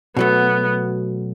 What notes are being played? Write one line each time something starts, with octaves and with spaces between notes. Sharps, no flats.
B2 F#3 A3 B3